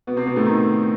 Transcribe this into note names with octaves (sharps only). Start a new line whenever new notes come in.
B2 B3
C3 C4
B2 B3
A2 A3
D#3 D#4